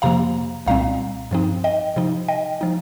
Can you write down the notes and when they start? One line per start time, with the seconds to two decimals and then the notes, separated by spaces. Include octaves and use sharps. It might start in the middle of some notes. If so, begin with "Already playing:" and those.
0.02 F2 C3 F3 A#3 F5 A#5
0.66 C2 A#2 G3 C4 F5 A#5
1.31 G2 F3 C4 D#4
1.64 D#5 G5
1.96 C3 F3 D#4
2.28 D#5 G5
2.61 F3 D#4